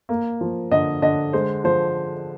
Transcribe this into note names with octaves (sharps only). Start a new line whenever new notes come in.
A#3
F3
D3 D#5
D3 D#5
G#3 C5
F3 C5